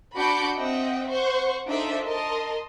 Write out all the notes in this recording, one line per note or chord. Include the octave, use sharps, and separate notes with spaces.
D4 F#4 B5 D6 G6 C#7
C4 D#5 E5 F#5 G5
C5 F#5 C#6
D4 D#4 F4 A4 C5 E5
A#4 D#5 A5 C6